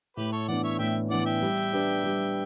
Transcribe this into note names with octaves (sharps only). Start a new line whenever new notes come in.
A2 G4 B4
A4 C#5
E3 B3 D4 D5 F#5
C#5 E5
A2 E5 G5
E3 B3 D4 D5 F#5
E5 G5
G3
D4 G4 B4
G3